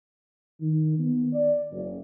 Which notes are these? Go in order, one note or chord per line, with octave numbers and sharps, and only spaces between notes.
D#3
B3
D5
F#1